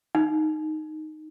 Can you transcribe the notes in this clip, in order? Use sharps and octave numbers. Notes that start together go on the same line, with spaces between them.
D#4